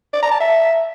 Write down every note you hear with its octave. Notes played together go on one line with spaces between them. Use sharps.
D5
A#5
A5
E5